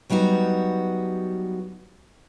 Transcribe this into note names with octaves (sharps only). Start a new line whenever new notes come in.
F#3 G3 B3 D#4 F#4